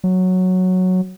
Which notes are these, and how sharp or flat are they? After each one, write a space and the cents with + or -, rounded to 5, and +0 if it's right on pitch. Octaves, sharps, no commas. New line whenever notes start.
F#3 -5